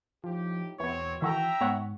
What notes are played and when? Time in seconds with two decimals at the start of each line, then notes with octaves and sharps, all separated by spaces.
0.24 A2 F3 D#4 G4
0.80 E2 B2 E3 B3 C4 C#5
1.22 D#3 E3 F#4 A4 E5 G5 A#5
1.61 G#2 B3 C#5 F#5